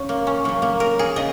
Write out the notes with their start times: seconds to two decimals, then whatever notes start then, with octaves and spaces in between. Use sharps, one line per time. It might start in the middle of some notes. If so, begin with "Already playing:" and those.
Already playing: C#3 C#4
0.09 A#3
0.27 C#4
0.44 C#3 F#3 A#3
0.62 A#3
0.80 A#4
0.99 G#4
1.16 C#3 D#5